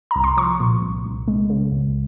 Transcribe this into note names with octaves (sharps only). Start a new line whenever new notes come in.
C2 A#5
C6
F3 C#6
A#2
C2
C2
G#3
C#3
C#2